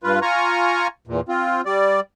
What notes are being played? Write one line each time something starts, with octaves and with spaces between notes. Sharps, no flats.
G2 F4 B4
F4 G#5 A#5 C#6
E2 A#2
C4 F4
G3 D5